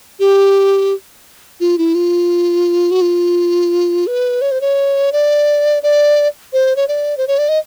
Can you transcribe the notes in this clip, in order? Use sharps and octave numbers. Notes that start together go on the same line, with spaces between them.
G4
F4
E4
F4
F#4
F4
B4
C#5
C5
C#5
D5
D5
C5
C#5
D5
C5
C#5
D5
D#5